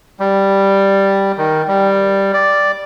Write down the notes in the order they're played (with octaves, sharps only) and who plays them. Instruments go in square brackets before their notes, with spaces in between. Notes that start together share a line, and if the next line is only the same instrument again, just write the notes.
[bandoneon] G3
D#3
G3
D5